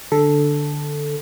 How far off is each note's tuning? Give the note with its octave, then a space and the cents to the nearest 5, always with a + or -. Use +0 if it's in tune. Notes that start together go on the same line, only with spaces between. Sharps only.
D3 +0 A4 +0